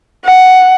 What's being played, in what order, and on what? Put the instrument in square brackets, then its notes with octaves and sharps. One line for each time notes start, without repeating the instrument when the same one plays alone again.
[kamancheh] F#5